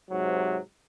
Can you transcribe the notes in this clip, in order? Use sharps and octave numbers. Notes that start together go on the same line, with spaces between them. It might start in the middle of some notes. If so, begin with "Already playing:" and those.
G#2 C3 F#3